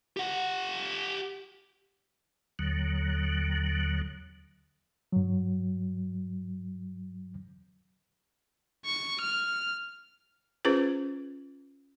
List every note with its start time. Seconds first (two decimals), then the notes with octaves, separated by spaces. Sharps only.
0.17 G4 F#5
2.59 D#2 D3 F#3
5.12 G2 F#3
8.86 C#6
9.21 F6
10.65 C#4 F4 G#4 B4 C5